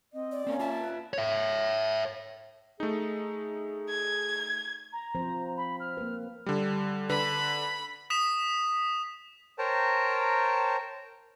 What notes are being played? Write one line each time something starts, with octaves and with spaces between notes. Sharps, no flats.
C4 D#5
D5
A#3 C4 C#4 C#5
F4 E5 A5
B4
C#5 E5
A3 D#4 G#4
G#6
A#5
F3 C4 C5
B5
F6
A#3 B4
D3 G3
D3 B4 B5
D#6 B6 E7
A#4 C5 C#5 G5 A5 A#5